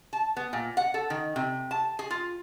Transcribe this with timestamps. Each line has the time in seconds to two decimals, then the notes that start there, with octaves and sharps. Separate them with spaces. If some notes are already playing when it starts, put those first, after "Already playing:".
0.13 A5
0.37 B3
0.53 A#2
0.77 F#5
0.94 A4
1.10 D#3
1.36 C3
1.71 A5
1.99 G#4
2.11 F4